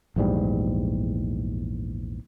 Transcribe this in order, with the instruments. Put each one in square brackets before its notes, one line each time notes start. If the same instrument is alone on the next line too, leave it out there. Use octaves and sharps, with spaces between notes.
[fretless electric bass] A#1 E2 G#2 G3